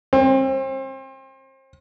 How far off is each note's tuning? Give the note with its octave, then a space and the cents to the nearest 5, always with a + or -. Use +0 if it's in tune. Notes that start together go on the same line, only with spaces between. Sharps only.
C4 +35